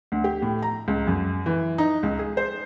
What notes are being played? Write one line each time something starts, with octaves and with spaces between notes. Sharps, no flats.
D2
G4
A2
A#5
C#2
F#2
E3
D#4
C#2
G#4
C5